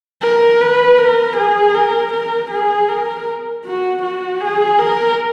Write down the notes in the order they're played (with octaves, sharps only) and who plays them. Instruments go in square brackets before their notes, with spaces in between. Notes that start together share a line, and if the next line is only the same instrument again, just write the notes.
[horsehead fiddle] A#4
B4
A#4
G#4
A#4
A#4
G#4
A#4
F#4
F#4
G#4
A#4